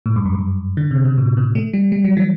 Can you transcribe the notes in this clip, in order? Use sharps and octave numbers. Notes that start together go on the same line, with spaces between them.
A2
G2
F#2
G2
D3
C3
B2
A2
B2
A3
G3
G3
F#3
E3